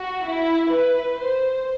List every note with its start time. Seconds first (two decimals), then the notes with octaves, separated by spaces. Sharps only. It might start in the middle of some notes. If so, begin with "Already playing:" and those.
Already playing: F#4
0.24 E4
0.70 B4
1.17 C5